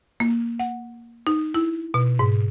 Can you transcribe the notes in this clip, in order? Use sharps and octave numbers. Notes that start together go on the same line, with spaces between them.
A#3
F#5
D#4
E4
B2
G#2